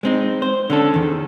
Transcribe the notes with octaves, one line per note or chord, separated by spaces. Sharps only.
G#3 C4 D#4
C5
D3 C#4 A4
E2 D#3